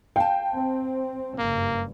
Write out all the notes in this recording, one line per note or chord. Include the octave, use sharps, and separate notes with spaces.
F5 G5 A5
C4
F#1 G2 A#3